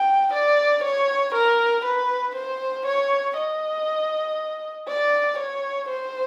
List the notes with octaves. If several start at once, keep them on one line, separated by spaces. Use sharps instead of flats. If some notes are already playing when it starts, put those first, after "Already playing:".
Already playing: G5
D5
C#5
A#4
B4
C5
C#5
D#5
D5
C#5
C5